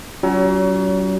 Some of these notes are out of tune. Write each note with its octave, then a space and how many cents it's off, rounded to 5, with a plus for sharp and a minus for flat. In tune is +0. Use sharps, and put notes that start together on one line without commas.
F#3 +40 C#4 +30 F4 +15